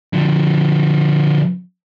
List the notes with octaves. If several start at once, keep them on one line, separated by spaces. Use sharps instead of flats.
D3 F3